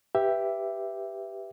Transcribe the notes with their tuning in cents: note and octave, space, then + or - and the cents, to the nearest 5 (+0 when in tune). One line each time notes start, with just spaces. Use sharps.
G4 +0 B4 +0 E5 +10